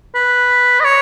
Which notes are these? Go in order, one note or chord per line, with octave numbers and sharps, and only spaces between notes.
B4
D#5
C#5